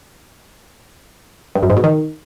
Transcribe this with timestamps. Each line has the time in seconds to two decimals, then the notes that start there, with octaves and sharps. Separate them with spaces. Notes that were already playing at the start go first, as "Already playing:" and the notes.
1.55 G2
1.63 F#2
1.70 G#2
1.77 B2
1.84 D#3